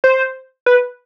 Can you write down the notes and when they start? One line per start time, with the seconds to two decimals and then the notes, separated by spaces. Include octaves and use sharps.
0.04 C5
0.66 B4